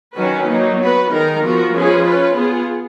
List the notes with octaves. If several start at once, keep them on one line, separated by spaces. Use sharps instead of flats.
D#3 F#3 C#4 F#4 B4
F#3 A#3 D#4
B3 F#4 B4
D#3 G#3 D#4 A#4
F3 B3 F#4 A#4
F3 G#3 C#4 G#4 B4
C#4 F4 B4
B3 F4 G#4